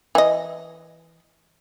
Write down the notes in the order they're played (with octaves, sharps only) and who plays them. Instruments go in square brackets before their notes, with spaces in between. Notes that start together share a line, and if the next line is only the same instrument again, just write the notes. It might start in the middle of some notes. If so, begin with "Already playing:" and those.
[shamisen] E3 D#5